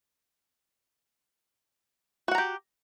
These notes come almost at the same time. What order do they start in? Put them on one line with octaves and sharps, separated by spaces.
F#4 F#5 A#5 G4